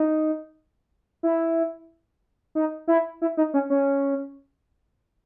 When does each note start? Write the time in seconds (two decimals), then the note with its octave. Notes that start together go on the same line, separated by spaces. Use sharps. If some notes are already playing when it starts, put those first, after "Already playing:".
Already playing: D#4
1.23 E4
2.55 D#4
2.88 E4
3.22 E4
3.37 D#4
3.54 C#4
3.70 C#4